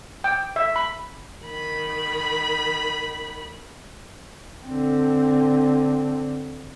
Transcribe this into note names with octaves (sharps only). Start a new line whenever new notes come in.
G5
E5
B5
D#3 B5
D3 C4